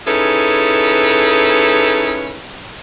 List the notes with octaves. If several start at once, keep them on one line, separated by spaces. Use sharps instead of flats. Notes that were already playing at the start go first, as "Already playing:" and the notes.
C#4 D#4 E4 G#4 A4 B4